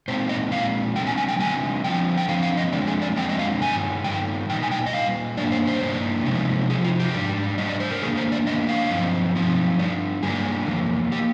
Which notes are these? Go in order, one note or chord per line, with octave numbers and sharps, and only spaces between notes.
A#2 G#3 C4 D#4 C5
D#5
A#2 G#3 C4 F5
D3 G3 C4 G5
G#5
G#5
G5
D3 G3 C4 G#5
D3 F3 C4 G5
G5
D3 F3 C4 F5
F5
D#5
F2 D3 G#3 C4 D5
G#4
D5
F2 D3 G#3 C4 G5
D#5
F5
G2 D#3 G3 G#5
G2 D#3 G3 G5
A#2 G3 D#4 G5
G#5
G5
D#5
A#2 G3 F5
G2 D#3 G3 A#3 D4 D5
C5
C5
G2 D#3 G3 A#3 D4
C3 F3 G#3 C4 D#4
C3 F3 D#4 G#4
F4
G4
G#2 G3 D4
G#2 G3 D4 D#5
D5
C5
A#4
D#3 A#3 D4 G#4
C5
D5
D#3 A#3 D4 D#5
F5
G2 F3 C4 D#4
G2 F3 C4 D#4
G2 D3 G3 D4 D5
G2 D3 G3 A#3 D4 G#4
F2 D#3 A#3
D#3 A#3 G4